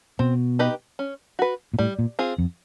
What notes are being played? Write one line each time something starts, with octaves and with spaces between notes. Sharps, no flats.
B2 C4
D#4 G4 B4 D#5
C#4
F#4 B4
A#2
A2 G3
A#2
C4 F4 G#4
F2